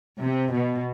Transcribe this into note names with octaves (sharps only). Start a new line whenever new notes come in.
C3
B2